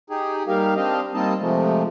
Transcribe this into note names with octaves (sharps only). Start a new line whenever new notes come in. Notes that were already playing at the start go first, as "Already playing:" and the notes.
D#4 G4 G#4
G3 A#3 D#4 G4 A#4 F5
C4 D4 G4 D#5 F5
G3 A#3 C4 D#4 D#5 A5
C3 F3 G#3 A3